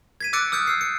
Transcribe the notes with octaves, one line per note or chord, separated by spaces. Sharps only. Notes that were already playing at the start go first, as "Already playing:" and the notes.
G#6 B6 D#7
D6 E6 F#6 A6 C#7 D7
D#6 F6 G6 C#7
E6 C7
C#7